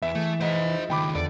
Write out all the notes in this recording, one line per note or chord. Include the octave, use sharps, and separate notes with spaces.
E2 E3 E5
A3 G#4
F3 G#3 E4 C5 F#5
C#2 D#3 G5 B5 D6
E2 D3 D5